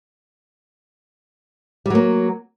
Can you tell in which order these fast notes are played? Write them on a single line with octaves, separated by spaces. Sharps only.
G3 F#3 A#3